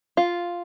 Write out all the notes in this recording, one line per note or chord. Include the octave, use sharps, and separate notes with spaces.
F4